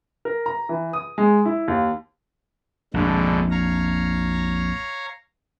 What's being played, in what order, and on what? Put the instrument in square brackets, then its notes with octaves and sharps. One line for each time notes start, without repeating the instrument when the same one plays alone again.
[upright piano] A#4
A#5
E3
D#6
G#3
E4
D#2
[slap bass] A#1 F2 [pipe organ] G#2 B2 D3
[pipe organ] C#5 F5 A#5